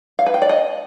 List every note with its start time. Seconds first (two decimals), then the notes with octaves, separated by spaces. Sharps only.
0.19 F5
0.26 B4
0.34 G5
0.42 D5
0.49 D#5